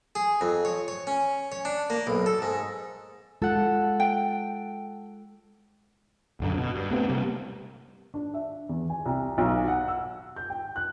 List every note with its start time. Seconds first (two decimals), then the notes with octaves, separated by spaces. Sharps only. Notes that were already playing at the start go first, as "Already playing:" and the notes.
0.15 G#4
0.41 F2
0.65 C#5
0.88 C#5
1.07 C#4
1.52 C#5
1.65 D4
1.90 A#3
2.07 B1
2.26 A4
2.42 G#2
3.42 G#3 F4 A4 F#5
4.00 G5
6.40 D#1 F#2 D3
6.58 B2
6.75 G2
6.90 A3 B3 C4
7.09 C3 G3 A#3
8.14 D4
8.34 E5
8.69 E2
8.90 G#5
9.05 C2
9.38 B1
9.68 F#5
9.88 E6
10.36 G6
10.50 G5
10.76 F#6